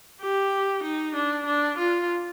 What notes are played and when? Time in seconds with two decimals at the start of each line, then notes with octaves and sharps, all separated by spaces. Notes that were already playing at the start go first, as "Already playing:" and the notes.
0.21 G4
0.83 D#4
1.15 D4
1.46 D4
1.78 F4